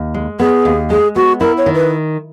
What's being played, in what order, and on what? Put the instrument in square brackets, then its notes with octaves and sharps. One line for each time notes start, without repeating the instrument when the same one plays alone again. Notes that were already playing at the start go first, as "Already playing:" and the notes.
Already playing: [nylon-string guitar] D#2
G#3
[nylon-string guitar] B3 [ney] G#4
[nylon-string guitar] D#2
[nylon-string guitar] G#3 [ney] G#4
[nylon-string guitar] B3 [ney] F#4
[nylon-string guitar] E4 [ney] A#4
[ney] C#5
[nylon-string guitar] D#3
[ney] B4